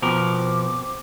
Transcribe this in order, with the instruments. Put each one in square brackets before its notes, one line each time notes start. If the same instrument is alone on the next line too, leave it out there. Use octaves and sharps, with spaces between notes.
[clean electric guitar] B2 F3 A#4 [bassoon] C4 [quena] D6